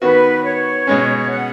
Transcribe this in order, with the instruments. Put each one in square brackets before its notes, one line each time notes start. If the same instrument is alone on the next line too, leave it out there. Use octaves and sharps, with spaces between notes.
[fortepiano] D#3 B3 F#4 [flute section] B4
[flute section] C#5
[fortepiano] B2 G#3 C#4
[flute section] F#5